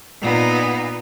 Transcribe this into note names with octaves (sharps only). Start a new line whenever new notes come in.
A#2 B3 D#4